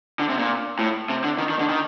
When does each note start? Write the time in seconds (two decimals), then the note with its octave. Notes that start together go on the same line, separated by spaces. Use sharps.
0.19 D3
0.29 C3
0.38 A#2
0.79 A2
1.09 C3
1.24 D3
1.38 D#3
1.49 D#3
1.59 D3
1.69 D#3